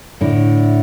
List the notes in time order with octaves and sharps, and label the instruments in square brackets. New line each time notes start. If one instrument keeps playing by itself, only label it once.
[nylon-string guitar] A2 D3